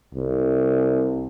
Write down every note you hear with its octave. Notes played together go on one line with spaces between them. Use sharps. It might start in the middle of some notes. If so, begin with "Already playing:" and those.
C2